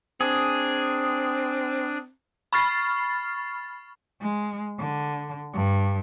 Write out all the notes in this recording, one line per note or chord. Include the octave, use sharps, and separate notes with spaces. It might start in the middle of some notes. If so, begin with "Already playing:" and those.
C4 D4 G#4
B5 C#6 F6 A6 C7
G#3
D3
G2